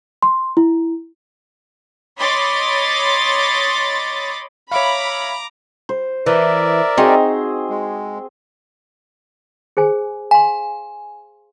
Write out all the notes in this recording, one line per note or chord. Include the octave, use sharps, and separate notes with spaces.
C6
E4
C#5 D#5 B5 C6 D6 A6
C#5 E5 F5 A#5 B5 D6
C5
E3 A#4 D5 E5
C4 D#4 F#4 G#4
G#3
G#4 C5 G#5
F5 G#5 C6